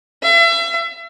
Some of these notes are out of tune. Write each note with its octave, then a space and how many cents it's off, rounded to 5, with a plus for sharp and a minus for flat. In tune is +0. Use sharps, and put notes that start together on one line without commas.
E5 +35